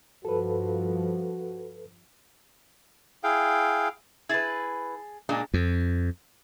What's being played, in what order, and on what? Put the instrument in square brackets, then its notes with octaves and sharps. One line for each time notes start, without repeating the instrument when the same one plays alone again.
[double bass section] G2 F3 [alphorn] F#4 [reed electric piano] A4 B4
[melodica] E4 G#4 F5 G5
[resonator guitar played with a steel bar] E4 B4 [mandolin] G#4 A5
[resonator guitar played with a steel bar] A#2 G#3 D4
[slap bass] F2